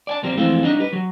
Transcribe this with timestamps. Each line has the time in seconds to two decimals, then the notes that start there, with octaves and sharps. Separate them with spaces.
0.07 D5 G#5 A5
0.23 A#2 F3 G3 A#3 C4
0.37 F2 E3 G#3 A3 C4 F4
0.64 G3 D4 D#4 D#5
0.80 G4 B4
0.93 F#3